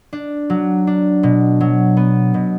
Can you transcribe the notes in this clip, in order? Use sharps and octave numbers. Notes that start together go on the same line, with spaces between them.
D4
F#3
D4
B2
F#3
B3
B2